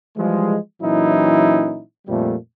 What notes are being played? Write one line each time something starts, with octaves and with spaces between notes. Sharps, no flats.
E3 F3 G3 G#3
A#2 E3 F#3 C#4 D#4 E4
F2 A#2 F3 G3 A3